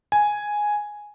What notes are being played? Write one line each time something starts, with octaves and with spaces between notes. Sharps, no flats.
G#5